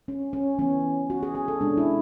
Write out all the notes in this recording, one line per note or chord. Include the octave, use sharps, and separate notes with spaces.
C#4
C#4
E3 B3 C#4
F#4
G#4
G#4
A4
B2 G#3 C#4 D4
E4